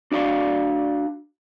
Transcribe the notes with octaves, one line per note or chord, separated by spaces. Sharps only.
D4 F#4 D5 F5